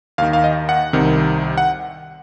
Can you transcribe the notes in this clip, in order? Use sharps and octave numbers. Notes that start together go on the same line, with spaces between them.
D#2 D#3 F5
F5
D#5
F#5
C2 C3 D#3
F#5